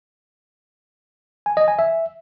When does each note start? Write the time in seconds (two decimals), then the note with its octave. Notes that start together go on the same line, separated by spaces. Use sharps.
1.46 G#5
1.57 D#5
1.68 G#5
1.79 E5